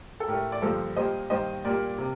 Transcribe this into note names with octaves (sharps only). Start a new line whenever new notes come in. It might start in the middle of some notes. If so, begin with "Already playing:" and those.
A4
A2 A3 G4 A#4
D5
G2 D3 F3 A#3 A4 C5
A#2 G3 A#3 C5 D#5
G2 D#3 A#3 C5 D#5
A#2 G3 A#3 A#4 D5
C3